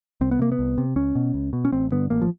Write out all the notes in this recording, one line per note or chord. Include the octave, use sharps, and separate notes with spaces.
C2 C4
B3
C3 A#3
B3
C2
C3
C#2 C#4
B2
C#2
B2
C#4
A1 C4
G2 D3 B3
A1 A#3
F3